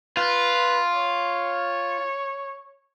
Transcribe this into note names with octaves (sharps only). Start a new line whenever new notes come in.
F4 B4
C#5